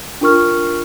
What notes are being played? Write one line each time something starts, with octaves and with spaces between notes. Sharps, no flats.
D4 F4 A#4 C#6 F6